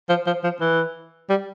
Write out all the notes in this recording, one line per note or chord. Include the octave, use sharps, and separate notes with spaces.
F3
F3
F3
E3
G3